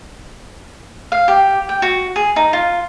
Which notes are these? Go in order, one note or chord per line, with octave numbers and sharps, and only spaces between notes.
F5
G4
G5
F#4
G#4
D#4
F4